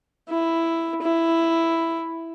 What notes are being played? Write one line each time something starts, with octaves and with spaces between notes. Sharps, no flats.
E4
E4